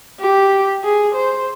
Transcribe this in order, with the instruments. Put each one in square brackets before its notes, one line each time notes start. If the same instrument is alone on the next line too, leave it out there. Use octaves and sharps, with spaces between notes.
[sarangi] G4
G#4
C5